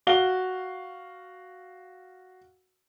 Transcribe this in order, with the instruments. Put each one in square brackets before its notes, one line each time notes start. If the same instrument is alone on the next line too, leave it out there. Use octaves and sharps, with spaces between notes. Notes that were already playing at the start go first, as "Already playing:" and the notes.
[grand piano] F#4 F5 G7